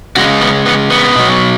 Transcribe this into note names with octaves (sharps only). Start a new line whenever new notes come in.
C#3 G#3 F#4
B3
B3
B3
B2 F#3